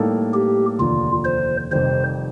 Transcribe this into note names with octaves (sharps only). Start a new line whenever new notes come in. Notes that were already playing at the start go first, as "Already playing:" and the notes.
Already playing: A2 G3 A#3 D#4 A4
G4
F1 D#2 D3 F3 F4
C5
F1 F2 D#3 G3 C5